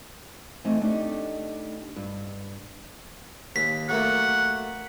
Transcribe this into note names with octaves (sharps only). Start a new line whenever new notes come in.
E3 A3 C4 D#4
A3 D4 D#4 G4
G2
D#2 B6
F#3 A3 A#3 F#5